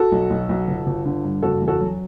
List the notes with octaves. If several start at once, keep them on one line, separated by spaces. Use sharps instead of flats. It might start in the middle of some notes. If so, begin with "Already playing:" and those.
Already playing: F#4 A4
B1
B1
B1
G1
G1
D3
G2
F#1 F#4 A4
E2
F#4 A4
F#3